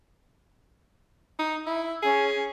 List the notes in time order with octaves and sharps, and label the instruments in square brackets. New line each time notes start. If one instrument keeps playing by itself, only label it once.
[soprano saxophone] D#4
[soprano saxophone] E4 [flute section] E6
[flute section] C#4 G#5 [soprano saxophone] G#4
[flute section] C#4